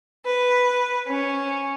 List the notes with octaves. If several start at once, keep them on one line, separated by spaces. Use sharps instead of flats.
B4
C#4